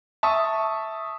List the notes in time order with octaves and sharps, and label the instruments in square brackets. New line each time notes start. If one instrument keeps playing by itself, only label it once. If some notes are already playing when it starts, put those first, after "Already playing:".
[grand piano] E5 A5 C#6 D#6